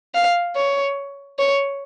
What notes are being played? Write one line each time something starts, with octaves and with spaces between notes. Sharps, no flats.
F5
C#5
C#5